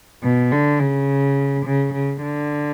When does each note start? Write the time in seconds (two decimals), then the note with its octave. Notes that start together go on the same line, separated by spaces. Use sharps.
0.24 B2
0.51 D3
0.80 C#3
1.65 C#3
1.93 C#3
2.22 D3